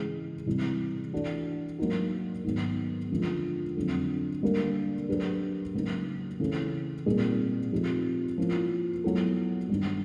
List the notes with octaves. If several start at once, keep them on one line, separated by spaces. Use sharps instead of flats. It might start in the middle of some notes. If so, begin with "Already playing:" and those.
Already playing: C#3 E3 G#3
C3 E3 G3
E3 A3 D4 F#4
F#3 A#3 D#4 F#4
G#2 D#3 F#3 B3
F#2 D3 F3 G#3
F2 D3 F#3 A3
D3 G3 A#3
F#3 A3 D4 G4 B4
C#3 F#3 A#3 D#4
C#3 E3 A3 C#4
A#2 G3 C4 D#4 G#4
F3 A3 C4 D#4 G4
F3 A#3 C#4 E4
F#3 B3 E4 A4
G2 D#3 G3